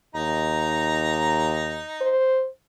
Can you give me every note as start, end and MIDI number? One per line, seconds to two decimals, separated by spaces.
0.15 1.81 39
0.15 2.12 63
0.15 2.12 82
2.01 2.48 72